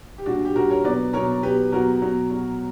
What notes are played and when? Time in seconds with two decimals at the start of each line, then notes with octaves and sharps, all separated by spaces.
0.18 G4
0.26 A#2 G3 D4 F#4
0.45 G4
0.55 A#2 G3 F#4 A#4
0.70 A#4 C#5
0.84 B2 F#3 B4 D5
1.13 B2 F#3 A#4 C#5
1.43 B2 F#3 G4 B4
1.72 B2 F#3 F#4 A#4
2.02 B2 F#3
2.31 B2 F#3